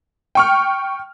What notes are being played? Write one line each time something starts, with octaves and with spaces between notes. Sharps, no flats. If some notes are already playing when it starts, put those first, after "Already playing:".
G5 C#6 F6